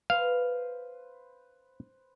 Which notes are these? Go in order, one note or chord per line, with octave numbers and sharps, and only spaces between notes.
B4 C5 F5